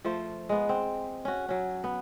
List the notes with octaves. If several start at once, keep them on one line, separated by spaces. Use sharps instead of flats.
F3 A3 C5
G#3 B3
C4
C#4 F#4
F#3 C#4
B3